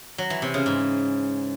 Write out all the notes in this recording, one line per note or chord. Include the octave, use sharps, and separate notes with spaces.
F#3
E3
C3
C#3
G#2